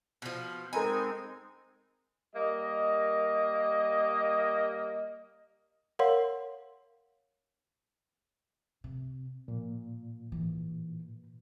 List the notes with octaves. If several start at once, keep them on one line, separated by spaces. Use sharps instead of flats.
B2 F3
G#3 C4 D#4 A#4 G#5 A#5 B5
G3 A#3 A#4 D#5
A#4 C#5 F5 F#5 C6
C3
A#2 F3
G#2 E3